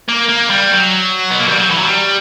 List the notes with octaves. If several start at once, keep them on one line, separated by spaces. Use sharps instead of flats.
A#3
A#3
G3
F#3
B3
A#3
G3
F#3
E3
F#3
G3